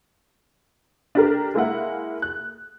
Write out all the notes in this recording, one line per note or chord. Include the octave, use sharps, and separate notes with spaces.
D4 G4 A#4
G#3 A#3 E4 F#5
F#6